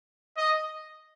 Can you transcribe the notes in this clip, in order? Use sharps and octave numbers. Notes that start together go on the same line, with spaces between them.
D#5